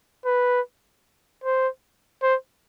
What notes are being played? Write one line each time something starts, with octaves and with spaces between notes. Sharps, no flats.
B4
C5
C5